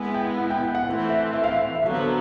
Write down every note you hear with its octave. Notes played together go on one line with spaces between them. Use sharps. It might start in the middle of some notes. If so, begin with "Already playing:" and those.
Already playing: G#3 B3 E4 G#5
G5
F#5
G5
G5
F#5
E3 A3 C4 F#5
E5
E5
F5
E5
E5
D3 F#3 B3 F5
C5